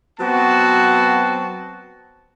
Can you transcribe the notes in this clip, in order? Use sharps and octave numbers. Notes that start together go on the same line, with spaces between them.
F#3 B3 C4 F#4 A5